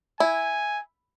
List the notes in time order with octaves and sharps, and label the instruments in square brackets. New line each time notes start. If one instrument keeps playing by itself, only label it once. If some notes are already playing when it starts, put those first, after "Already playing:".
[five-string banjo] E4 [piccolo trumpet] G#5